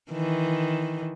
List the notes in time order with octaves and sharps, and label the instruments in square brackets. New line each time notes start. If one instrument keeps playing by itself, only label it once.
[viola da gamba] D#3 E3